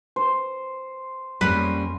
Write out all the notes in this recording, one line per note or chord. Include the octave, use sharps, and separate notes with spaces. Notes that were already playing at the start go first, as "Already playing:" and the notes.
C5
F2 G3 A#3 C#4 B4